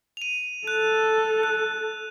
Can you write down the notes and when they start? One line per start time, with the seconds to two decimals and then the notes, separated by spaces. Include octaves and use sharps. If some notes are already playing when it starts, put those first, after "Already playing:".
0.17 D#7 F7
0.67 A4 F#6
1.43 F#6